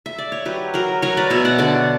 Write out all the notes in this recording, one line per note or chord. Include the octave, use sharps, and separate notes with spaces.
E5
D5
C#5
F#3 G4 B4
F#3 F#4 A#4
F#3 A#4 C#5
B4 D5
B2 C#5 E5
D5 F#5
D3 D5 F#5